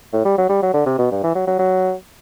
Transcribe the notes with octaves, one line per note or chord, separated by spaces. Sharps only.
A2
G3
F#3
G3
F#3
D3
C3
B2
G2
E3
F#3
F#3
F#3